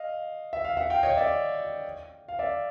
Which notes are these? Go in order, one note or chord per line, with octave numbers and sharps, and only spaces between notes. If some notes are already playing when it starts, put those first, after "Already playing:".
Already playing: D#5 F5
E5
F5
E5 F#5
F5 G5
C#5 D#5
D5 E5
F5
D5 E5